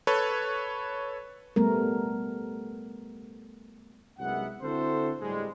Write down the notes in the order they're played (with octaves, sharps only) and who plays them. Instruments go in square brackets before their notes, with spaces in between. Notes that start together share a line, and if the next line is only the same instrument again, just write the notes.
[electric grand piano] A4 B4 C#5
[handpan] G3 A3 B3 A#4
[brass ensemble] C2 F#2 G#3 B3 E5 F#5
D3 C4 E4 F#4 A4 C5
A2 G3 G#3